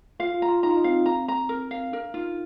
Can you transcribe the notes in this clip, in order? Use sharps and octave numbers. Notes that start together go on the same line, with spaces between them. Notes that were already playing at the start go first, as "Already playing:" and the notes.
F4 F5
F4
A#5
F4
D#4 A#5
F4
D#4
C4 F5
A#5
A#5
A#4
F5
D4 A#4
D#4 F4